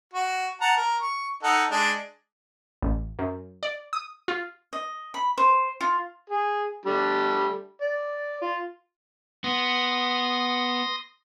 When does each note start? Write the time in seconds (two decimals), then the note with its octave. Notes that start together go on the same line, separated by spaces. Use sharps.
0.14 F#4
0.61 F#5 A5 A#5
0.77 A#4
1.01 C#6
1.43 D#4 A4 F#5
1.71 G#3 D4
2.82 A1
3.19 F#2
3.63 D5
3.93 D#6
4.28 F4
4.73 D#5
5.14 B5
5.38 C5
5.81 F4
6.30 G#4
6.86 G3 A3 D4
7.81 D5
8.42 F4
9.44 B3 C6 D#6 A#6